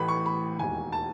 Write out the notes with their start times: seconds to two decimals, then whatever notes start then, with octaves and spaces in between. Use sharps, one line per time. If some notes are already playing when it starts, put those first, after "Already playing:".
Already playing: A1 A2 E3 B5
0.08 C#6
0.26 B5
0.58 E1 D#2 D#3 G#5
0.92 A5